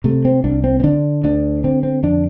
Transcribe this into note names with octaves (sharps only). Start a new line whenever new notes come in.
C3 A3
C4
C2 D4
C4
C4
D3 D4
D2 D4
D3 C4
C4
F2 D4